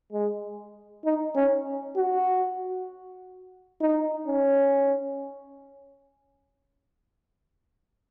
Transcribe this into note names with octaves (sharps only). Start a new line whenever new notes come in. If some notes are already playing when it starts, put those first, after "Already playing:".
G#3
D#4
C#4
F#4
D#4
C#4